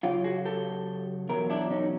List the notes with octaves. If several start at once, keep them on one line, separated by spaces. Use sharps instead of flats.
F#2 C#3 F#3 F4 G4
F#4 G#4
G4 A4
E2 B2 F#3 A#4
D4 E4
C#4 D#4